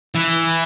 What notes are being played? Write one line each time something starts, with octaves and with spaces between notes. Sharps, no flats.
E3